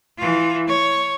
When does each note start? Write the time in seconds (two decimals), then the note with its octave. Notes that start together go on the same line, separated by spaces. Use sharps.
0.18 E3 F4
0.67 C#5